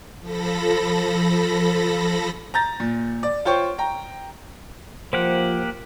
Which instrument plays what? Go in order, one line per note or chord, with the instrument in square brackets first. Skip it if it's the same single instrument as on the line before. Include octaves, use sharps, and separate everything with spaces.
[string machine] F3 A4 B5 A#6
[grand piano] A#5 G6 A6 A#6
A#2
D5
F4 C5 C#5 G5 C#6
G5 A#5
[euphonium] F3 [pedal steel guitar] A#3 G4 F#5 [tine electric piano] C5